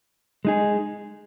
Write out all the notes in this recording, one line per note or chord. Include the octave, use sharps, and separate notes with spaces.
G#3 D#4 G#4